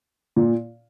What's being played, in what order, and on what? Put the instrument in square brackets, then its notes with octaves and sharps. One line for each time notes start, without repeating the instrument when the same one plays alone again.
[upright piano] A#2